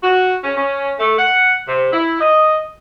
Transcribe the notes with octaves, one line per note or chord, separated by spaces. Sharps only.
F#4
C#4
C#4
A3
F#5
C3
E4
D#5